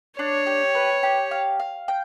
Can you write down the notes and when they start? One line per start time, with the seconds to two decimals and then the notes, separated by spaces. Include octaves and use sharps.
0.19 D4 C#5
0.47 G4
0.75 B4
1.03 G4
1.31 F5
1.59 F5
1.88 G5